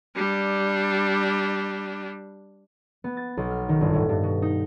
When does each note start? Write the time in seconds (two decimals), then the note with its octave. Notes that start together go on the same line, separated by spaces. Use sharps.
0.15 G3 D4
3.04 B3
3.17 A6
3.37 B1
3.50 F6
3.69 D#3
3.81 G1
3.94 A2
4.09 G2
4.23 B2
4.42 D#4